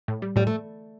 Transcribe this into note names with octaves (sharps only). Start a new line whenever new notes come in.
A2
G3
A2 G3
A3